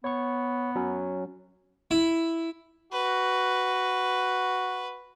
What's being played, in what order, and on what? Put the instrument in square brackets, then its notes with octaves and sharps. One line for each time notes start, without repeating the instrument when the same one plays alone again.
[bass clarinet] B3 [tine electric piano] C#5 C#6
[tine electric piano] F#3 C#4
[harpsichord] E4
[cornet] F#4 [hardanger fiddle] B4